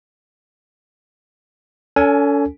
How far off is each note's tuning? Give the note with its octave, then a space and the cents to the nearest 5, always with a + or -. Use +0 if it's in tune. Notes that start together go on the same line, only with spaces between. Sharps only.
C#4 +40 A4 +20 G#5 +10